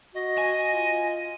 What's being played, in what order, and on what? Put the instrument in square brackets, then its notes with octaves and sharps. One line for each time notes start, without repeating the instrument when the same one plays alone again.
[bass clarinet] F#4 [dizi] D#5
[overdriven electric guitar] G#5
[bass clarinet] F4